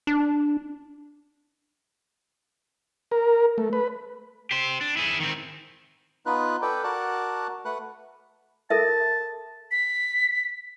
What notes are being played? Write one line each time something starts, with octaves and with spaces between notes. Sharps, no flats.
D4
A#4
A3
B4
G4 C5
D4
E4 G#4
D#3 C4
B3 D#4 F4 B4 F#6
A4 B4 D5 G5
F#4 A#4 D5 A5 F#6
A3 B4 F#5 F#6
A4 A#4 E5 A5
B6